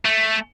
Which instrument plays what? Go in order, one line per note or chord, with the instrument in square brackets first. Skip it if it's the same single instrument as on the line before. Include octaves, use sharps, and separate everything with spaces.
[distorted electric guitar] A3